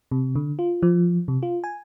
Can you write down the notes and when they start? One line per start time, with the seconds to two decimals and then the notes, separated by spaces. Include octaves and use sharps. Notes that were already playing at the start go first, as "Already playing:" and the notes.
0.11 C3
0.36 D3
0.59 F4
0.83 F3
1.28 C3
1.43 F4
1.64 G#5